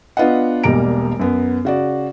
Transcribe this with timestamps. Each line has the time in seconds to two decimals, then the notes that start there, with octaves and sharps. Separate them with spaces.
0.17 B3 D4 F4 B4 D#5 F#5
0.64 E1 B1 G3 A#3 A#5 D7
1.19 F#2 B3
1.65 C#3 F#4 D5